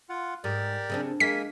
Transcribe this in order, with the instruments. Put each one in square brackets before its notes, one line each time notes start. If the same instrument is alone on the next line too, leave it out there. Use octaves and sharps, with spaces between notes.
[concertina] F4 F#5
[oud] G#2 [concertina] G4 A#4 D5
[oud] C#3 C4 D4
[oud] G#3 [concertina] A#3 A#4 G#5 [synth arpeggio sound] B6